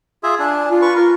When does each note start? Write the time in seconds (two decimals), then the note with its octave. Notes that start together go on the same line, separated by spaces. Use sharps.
0.23 F4 G#4 E5
0.39 D4 G#5
0.69 F4
0.82 B4 C#6
0.96 A#4